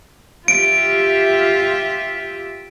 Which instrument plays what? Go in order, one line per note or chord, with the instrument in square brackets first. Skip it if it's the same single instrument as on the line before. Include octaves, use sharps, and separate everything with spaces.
[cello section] F4 G4 E5 [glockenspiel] D7